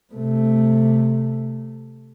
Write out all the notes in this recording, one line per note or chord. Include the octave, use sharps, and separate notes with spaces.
C3 A3